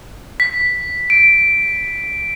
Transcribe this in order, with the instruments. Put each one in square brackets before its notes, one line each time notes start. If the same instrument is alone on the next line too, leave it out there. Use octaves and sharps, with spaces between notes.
[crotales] B6
D7